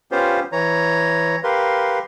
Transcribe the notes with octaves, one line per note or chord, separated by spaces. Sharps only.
B3 C#4 F4 G4 C5 F5
E3 C#5 A#5
G4 A#4 B4 F5 C6